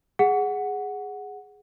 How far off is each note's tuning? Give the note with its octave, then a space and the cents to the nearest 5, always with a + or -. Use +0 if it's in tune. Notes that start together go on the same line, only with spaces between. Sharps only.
G#4 -5 F#5 +0